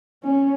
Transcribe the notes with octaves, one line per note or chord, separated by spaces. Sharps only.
C#4